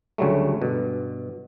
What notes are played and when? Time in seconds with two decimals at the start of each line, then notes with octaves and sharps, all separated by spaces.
0.18 D2 C#3 F#3 G3 A3
0.62 G2 B2